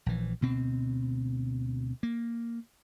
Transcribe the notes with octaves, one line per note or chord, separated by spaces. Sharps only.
A#1 E3
D2 B2 C4
A#3